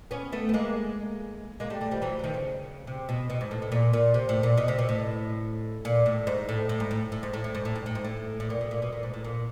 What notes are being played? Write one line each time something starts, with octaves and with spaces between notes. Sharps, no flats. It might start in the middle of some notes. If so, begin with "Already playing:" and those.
B3 C#4
A3 B3
B3
G#3 A#3
G#3 A#3
G3 A3
G3 A3
F3 G3
E3 F#3
F#3
D#3 F3
C#3
C3
B2
B2
G#2
A2
A2
A#2
A#2
C3
A2
A#2
B2
C3
B2
A2
A#2
A2
G#2
A2
A2
G#2
A2
A2
G#2
A2
A2
G#2
A2
G#2
A2
G#2
A2
A2
A#2
B2
A#2
B2
A#2
G#2
A2
A#2